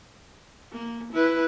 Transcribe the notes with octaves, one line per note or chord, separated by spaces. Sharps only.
A#3
E4 B4